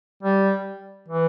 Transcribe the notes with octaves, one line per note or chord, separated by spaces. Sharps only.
G3
E3